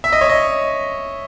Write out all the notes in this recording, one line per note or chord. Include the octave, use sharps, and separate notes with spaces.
E5
D#5
C#5
D#5